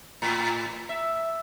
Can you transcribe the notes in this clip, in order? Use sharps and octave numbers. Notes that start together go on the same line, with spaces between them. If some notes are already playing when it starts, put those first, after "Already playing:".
A2
E5